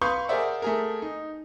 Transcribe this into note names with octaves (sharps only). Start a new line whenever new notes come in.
B4 F5 C6 C#6 D#6 G6
G#4 A#4 C5 D5 E5 F#5
A3 G#4 A#4
D#4